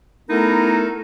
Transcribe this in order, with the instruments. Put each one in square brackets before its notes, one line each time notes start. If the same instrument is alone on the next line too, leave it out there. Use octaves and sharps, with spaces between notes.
[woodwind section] A3 B3 D#4 E4 A4 A#4